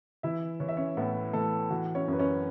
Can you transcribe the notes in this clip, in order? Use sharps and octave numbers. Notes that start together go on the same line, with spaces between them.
E3 E4 E5
E3 C#5
E5
C#4 C#5
A2 B3 B4
E3 A3 A4
E3 F#4
C#4 C#5
F#2 B4
C#4 C#5